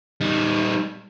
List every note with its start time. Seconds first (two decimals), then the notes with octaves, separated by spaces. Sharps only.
0.21 G3 D#4